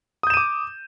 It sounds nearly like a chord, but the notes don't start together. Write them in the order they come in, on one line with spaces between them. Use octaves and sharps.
D#6 G6 E7 D#7 D6